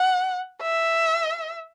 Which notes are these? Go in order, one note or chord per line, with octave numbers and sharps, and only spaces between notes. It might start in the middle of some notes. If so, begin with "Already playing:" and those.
Already playing: F#5
E5